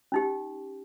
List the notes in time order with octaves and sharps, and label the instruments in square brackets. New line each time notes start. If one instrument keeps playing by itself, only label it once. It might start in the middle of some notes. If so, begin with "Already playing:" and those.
[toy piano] C#4 D#4 G4